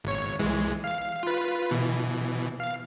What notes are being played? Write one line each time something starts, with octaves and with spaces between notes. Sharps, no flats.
G#1 C#5
C2 E3 G#3
F5
F4 B4
B2 E3
F5